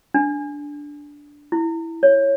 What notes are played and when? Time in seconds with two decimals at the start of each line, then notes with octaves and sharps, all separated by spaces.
0.14 D4
1.52 E4
2.03 C#5